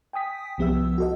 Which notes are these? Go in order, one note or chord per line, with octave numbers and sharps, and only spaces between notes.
G5 G#5 D#6 B6
C2 F3 B3 G4 E5 E6
F#4 A4 D#5